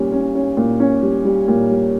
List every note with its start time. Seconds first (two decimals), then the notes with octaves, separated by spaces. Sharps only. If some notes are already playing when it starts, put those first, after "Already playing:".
Already playing: A#2 G3 C#4
0.12 C#4
0.35 C#4
0.57 A#2
0.80 C#4
1.02 G3
1.25 G3
1.48 A#2
1.70 G3